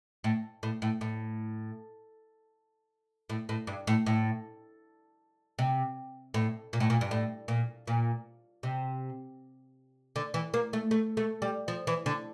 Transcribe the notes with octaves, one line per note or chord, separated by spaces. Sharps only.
A2
A2
A2
A2
A2
A2
G2
A2
A2
C3
A2
A#2
A2
A#2
G2
A2
A#2
A#2
C3
D3
E3
A#3
A3
A3
A3
G3
F3
E3
D3